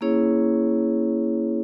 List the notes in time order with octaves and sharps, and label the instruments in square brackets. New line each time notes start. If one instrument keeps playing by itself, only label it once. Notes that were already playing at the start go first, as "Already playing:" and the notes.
[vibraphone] A#3 C#4 E4 G#4 C#5